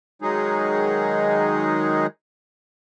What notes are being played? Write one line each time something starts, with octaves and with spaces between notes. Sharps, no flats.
D#3 F#3 G#3 D#4 G#4